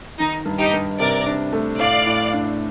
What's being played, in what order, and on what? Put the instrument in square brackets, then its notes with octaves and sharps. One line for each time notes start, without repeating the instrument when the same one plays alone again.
[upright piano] D#3 [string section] D#4
[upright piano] G2
[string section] D#4 G4
[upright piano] G2
[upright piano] C3 [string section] A#4 D5
[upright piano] D4
A3
[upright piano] A2 [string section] D5 F5
[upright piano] A2
D4